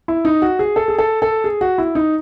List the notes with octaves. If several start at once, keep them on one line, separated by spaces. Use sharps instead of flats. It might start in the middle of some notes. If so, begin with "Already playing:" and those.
E4
D#4
F#4
G#4
A4
G#4
A4
A4
G#4
F#4
E4
D#4